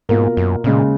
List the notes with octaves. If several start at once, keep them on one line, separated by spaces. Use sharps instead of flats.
G#2 B2 A#3 F4 A#4
F#2
D#2 A#2 C#3 G#3